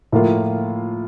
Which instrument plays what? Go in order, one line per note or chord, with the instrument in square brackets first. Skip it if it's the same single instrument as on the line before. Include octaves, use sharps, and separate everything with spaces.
[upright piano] A2 F3 A#3 F4